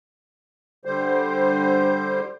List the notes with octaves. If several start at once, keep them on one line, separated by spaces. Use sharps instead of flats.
D3 G3 C5